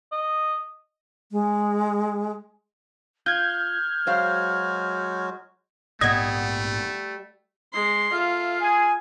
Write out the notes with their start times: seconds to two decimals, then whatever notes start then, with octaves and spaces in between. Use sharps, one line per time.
0.11 D#5
1.32 G#3
3.26 F4 F6 G6 G#6
4.07 F#3 G#3 F#4 C5 D5 F5
6.01 A#1 G#2 G3 A3 B3 D#5 F#5 G#6
7.74 G#3 C6
8.12 F4 A4 E5 F5
8.61 G#4 G#5